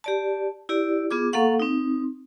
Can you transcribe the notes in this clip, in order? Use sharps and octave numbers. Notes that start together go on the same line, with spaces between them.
G4 D5 A5
E4 G4 D5
B3 F4 G#4 D6
A#3 A4 F5 F#5 C#6
C4 D#4